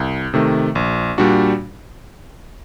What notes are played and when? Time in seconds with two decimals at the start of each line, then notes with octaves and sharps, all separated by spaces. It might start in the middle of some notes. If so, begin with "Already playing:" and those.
Already playing: C2
0.34 C3 D#3 A3
0.75 A#1
1.18 A#2 G3 D4 F#4